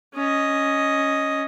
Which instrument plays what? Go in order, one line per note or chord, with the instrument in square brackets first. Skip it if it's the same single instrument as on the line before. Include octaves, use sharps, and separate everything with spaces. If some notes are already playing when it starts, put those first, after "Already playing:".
[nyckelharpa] C#4 D#5